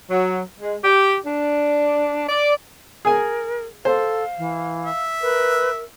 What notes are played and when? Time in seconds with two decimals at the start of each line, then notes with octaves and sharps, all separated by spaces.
0.10 F#3
0.60 G#3
0.83 G4
1.25 D4
2.28 D5
3.05 G#4 A#4 G#5
3.85 A4 C5 F5
4.38 E3
4.85 E5
5.22 A#4 B4